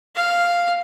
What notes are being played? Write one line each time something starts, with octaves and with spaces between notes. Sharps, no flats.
F5